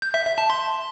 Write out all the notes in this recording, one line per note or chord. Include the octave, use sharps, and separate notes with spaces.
G6
E5
E5
A5
C6